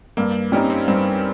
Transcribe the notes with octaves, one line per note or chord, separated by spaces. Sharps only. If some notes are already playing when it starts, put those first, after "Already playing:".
G2 A#3
G3 C4 C#4 D#4
C4
G2 C4